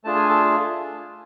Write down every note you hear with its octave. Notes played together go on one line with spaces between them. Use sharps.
A3 D4 F4 G#4 A5
G#5
A4 A5